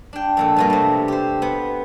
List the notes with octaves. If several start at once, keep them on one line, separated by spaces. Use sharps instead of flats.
D4 G5
F2 A#2 A4
G2 B2 A#3
C3 A3
G4 C5
B3